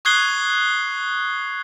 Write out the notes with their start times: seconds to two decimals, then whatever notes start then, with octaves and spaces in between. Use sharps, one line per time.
0.05 C#6 D#6 F#6 G#6 C7 G7